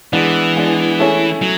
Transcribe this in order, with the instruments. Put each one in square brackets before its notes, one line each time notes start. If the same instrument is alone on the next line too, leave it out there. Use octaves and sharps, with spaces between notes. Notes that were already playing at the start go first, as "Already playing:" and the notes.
[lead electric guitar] E3 [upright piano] G#3 B3 D4
[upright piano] G#3 B3 D4
A3 C#4 E4 G#4 C#5
[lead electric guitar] F#3 [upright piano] A3